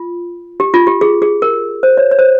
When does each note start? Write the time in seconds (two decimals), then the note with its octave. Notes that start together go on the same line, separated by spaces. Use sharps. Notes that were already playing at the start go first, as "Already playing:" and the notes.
Already playing: F4
0.60 G4
0.74 F4
0.87 G4
1.01 G#4
1.22 G#4
1.42 A#4
1.83 C5
1.97 C#5
2.11 C#5
2.19 C5